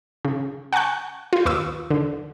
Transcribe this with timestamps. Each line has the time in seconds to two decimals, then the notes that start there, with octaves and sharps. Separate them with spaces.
0.25 C#3
0.73 F#5 G#5 A5 C#6 F#6
1.33 F4 G6
1.46 D#2 B4 C#6 D#6 E6
1.91 D3